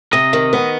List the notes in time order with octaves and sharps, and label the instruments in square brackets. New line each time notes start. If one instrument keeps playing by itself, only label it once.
[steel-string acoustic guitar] C3 [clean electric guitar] D#5
[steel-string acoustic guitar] D#3
B3